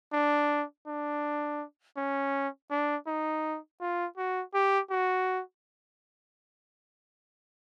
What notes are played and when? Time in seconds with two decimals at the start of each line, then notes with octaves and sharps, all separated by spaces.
0.13 D4
0.87 D4
1.97 C#4
2.71 D4
3.07 D#4
3.81 F4
4.17 F#4
4.54 G4
4.91 F#4